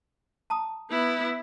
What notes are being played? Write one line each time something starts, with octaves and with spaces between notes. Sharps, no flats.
A5 A#5 D#6
B3 E4